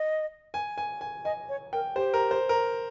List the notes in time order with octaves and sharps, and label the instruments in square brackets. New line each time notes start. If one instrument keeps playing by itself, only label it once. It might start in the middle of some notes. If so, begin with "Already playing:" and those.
Already playing: [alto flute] D#5
[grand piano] G#5
G#5
G#5
[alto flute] D#5 [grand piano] G#5
[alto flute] C#5
[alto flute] A#4 [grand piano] G5
[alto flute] G4 [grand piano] C5
[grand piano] A#4
C5
A#4